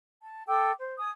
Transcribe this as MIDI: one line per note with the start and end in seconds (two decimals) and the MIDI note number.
0.22 0.42 81
0.47 0.70 69
0.47 0.70 79
0.47 0.70 86
0.47 0.70 88
0.79 0.94 72
0.97 1.11 80
0.97 1.11 87